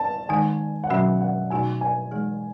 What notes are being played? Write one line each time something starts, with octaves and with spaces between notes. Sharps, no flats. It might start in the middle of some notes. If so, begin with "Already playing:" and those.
Already playing: A5
D#3 G#3 D#4 G#5
F#5
B2 F#3 C#4 F#4 E5
F#5
B2 A3 D#4 F#4 G#5
G#5
E3 G#3 D#4 G#4